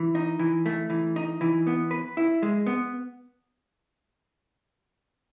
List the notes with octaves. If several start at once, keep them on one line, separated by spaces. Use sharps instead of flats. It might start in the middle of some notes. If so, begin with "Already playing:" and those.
Already playing: E3
D#4
E3
A3
E3
D#4
E3
B3
B4
E4
G#3
B3